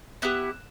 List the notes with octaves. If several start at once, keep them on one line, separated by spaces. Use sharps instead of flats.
B3 E4 G4 E6 F#6